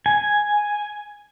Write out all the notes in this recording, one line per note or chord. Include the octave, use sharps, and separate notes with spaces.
G#5